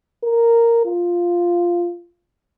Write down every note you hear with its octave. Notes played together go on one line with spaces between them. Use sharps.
A#4
F4